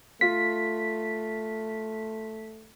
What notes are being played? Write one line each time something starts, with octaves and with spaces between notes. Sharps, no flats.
A3 F4 B6